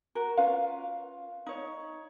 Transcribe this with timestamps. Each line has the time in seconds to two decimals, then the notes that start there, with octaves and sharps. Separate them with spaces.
0.15 F#4 A#4
0.37 C#4 F4 B4 F5
1.46 D#4 C#5